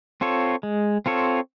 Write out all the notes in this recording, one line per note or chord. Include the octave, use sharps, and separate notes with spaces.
C4 F4 A4 C#5
G#3
C4 F4 A4 C#5